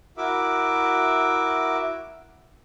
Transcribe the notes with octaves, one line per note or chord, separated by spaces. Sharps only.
E4 F#4 A#4 E5 D6